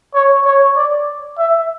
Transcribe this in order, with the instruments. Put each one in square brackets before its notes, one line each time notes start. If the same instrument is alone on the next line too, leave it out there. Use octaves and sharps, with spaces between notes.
[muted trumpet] C#5
C#5
D5
E5